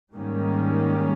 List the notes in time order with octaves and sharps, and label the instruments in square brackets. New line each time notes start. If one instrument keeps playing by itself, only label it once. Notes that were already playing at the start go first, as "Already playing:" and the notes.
[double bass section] G#2 D#3 G3 A#3 C#4